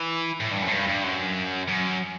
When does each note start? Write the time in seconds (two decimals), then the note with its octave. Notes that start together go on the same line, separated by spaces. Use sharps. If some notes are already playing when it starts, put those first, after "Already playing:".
Already playing: E3
0.40 A2
0.51 G2
0.62 F#2
0.68 A2
0.72 G2
0.88 G2
1.04 F#2
1.68 F#2